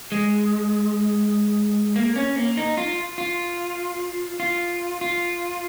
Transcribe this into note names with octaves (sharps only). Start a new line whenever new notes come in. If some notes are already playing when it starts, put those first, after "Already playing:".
G#3
A#3
C#4
A#3
D#4
F4
F4
F4
F4